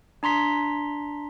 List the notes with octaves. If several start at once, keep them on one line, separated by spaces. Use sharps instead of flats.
D4 A#5 C6 B6